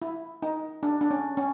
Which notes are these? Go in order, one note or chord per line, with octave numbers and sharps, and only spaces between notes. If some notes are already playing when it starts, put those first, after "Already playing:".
E4
D#4
D4
D4
C#4
C#4